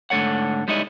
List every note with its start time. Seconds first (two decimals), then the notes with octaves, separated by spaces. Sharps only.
0.10 G#2 D3 A3 A4 C#5 F#5
0.68 G3 G#3 D#4 E4 C#5 D#5